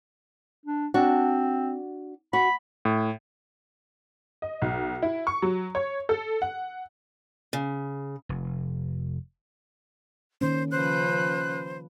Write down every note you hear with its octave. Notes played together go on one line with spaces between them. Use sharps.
D4
C4 D4 F#4
F#4 B5
A2
D#5
B1
E4
C#6
F#3
C#5
A4
F#5
C#3
F1
D#3 A#3 C#4 C5
C#3 F3 B4 C5 F#6